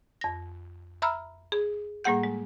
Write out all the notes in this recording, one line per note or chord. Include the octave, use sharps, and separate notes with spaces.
F2 A#6
E5 A#5 B5 E6 F6
G#4
A2 G3 A#3 G#4 F#5 G6
G#3